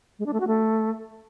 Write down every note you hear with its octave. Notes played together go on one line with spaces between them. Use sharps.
G#3
D4
A3
F#4
A3